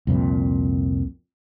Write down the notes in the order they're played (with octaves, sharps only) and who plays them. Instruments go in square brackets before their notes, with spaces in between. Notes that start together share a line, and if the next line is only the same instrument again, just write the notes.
[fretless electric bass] C2 F2 A#2